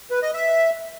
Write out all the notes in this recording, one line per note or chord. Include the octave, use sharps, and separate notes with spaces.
B4
D#5
E5